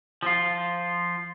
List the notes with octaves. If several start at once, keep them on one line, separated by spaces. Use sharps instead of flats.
F3 F4